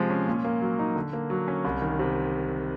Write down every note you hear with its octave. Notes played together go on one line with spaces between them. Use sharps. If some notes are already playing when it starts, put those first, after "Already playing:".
Already playing: C3 F3 G#3
C#4
A#2
A#3
F#3
D#4
D3
A#3
F#3
C#4
C2
D#3
C3